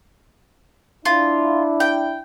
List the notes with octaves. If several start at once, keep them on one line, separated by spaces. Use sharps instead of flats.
D4 E4 F4
G5